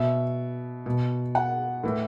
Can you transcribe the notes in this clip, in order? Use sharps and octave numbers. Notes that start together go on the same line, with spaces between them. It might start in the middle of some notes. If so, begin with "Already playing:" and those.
Already playing: B2 E5
B2
F#5
A2 E3